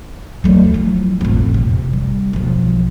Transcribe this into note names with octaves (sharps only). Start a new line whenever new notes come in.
F#3 A3
F3 E4
A1 F2
C3
G3
B1 F3